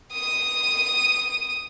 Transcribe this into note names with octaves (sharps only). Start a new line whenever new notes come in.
D#6 D#7